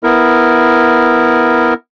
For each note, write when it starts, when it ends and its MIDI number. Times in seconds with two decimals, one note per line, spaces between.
0.03 1.74 59
0.03 1.74 64
0.03 1.74 70